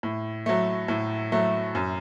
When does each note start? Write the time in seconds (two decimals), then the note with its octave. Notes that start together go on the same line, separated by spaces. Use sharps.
0.03 A2
0.46 F#3 A3
0.88 A2
1.32 F#3 A3
1.75 F#2